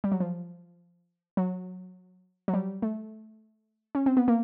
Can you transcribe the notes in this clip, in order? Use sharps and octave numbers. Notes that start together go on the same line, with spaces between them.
G3
F#3
F3
F#3
F#3
G3
A3
C#4
C4
B3
A#3